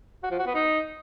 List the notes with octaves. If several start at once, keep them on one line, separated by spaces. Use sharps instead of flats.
F#4
F3
F#4
B3
D#4